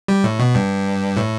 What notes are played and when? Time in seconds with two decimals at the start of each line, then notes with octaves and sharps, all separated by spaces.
0.08 G3
0.24 A2
0.39 B2
0.55 G2
1.17 A2